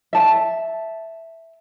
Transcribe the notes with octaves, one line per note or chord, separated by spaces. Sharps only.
E5 A5